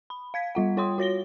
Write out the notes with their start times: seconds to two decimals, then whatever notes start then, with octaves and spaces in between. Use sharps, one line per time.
0.10 B5
0.34 F5 G#6 B6
0.55 G3 F4 F#5
0.77 F4 C#5 G5 C6 D#6
0.98 F#4 C#5 A#6 G7